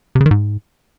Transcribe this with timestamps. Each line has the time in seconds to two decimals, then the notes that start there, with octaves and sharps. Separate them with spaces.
0.15 C3
0.21 C#3
0.26 D#3
0.31 G#2